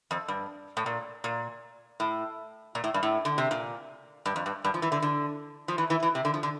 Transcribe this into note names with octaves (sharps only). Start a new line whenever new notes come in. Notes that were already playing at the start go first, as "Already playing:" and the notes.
F2
G2
A2
A#2
A#2
A2
A#2
A2
G2
A2
D3
C3
A#2
G2
F2
G2
G2
F3
E3
D3
D3
F3
E3
E3
E3
C3
D3
F3
D3